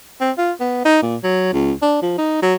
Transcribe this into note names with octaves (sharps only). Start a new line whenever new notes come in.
C4
F4
B3
D#4
A#2
F#3
C#2
D4
F3
D#4
F#3